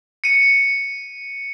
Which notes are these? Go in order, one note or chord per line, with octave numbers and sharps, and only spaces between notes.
C#7 D#7